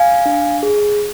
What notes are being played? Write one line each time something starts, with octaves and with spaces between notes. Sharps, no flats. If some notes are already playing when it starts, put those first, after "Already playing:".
Already playing: F5 G#5
D4
G#4